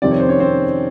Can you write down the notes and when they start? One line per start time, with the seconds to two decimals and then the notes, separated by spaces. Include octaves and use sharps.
0.02 F2 C3 D#3 G3 C4 D5
0.11 C#5
0.20 C5
0.28 C#4 C#5
0.40 C4 C5